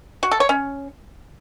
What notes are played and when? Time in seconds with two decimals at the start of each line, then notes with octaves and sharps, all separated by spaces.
0.23 F#4
0.31 A4
0.40 C#5
0.49 C#4